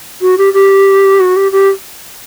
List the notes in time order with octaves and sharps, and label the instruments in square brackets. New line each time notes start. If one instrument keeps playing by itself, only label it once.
[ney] F#4
G4
G4
F#4
G4
G4